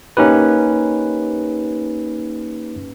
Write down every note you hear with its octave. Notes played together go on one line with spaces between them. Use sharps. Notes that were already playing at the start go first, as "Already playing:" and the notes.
A#3 C#4 D#4 G4 B4